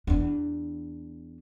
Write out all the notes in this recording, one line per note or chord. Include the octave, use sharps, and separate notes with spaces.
E2 D4